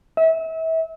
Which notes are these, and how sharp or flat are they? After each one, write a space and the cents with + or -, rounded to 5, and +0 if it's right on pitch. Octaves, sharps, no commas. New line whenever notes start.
E5 -30